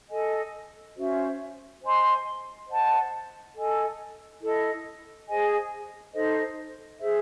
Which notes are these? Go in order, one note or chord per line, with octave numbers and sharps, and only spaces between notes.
A4 D#5 G#5
C#4 F#4 C5 E5
C5 D#5 G#5 C6
C5 D#5 F#5 A5
A4 D#5 G#5
E4 A4 D#5
G#4 C5 D#5 G#5
D#4 A4 C5 D#5
G#4 C5 E5